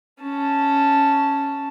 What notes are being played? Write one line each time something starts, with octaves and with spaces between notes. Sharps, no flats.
C#4 A5